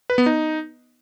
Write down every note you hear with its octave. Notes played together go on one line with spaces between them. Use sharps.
B4
B3
D#4